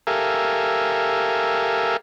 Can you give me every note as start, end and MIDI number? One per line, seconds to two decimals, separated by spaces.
0.07 1.97 67
0.07 1.97 69
0.07 1.97 70
0.07 1.97 76
0.07 1.97 77
0.07 1.97 80